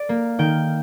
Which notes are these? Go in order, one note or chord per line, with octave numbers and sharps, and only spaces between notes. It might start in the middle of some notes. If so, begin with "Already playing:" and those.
Already playing: D5
A#3
D#3 G5